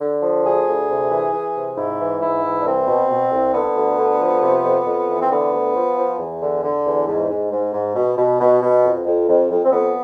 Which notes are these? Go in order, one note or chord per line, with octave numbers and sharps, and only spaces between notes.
D3
F3
D2 G#4
D2
C3
E3
E3
C3
G#2 E4
E3
G#2 E4
E3
D4
C2 C4
B2
B2
C2
D3 B3
D2
D3
F3
C3
F2
F2
E3
C4
D3 B3
D2
F3
F3
E2
D3
D3
E2
G#2
G#2
G#2
G#2
B2
B2
B2
B2
F2
F2
F2
F2
C4
F2 B3